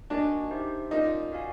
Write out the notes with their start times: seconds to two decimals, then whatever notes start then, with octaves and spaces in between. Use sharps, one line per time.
0.10 D4 F#4 A#4 D#5 G#5
0.51 D#4 G4 C5 E5
0.91 C#4 D#4 F4 A#4 D5
1.32 F#4 A#4 D5 F5 G#5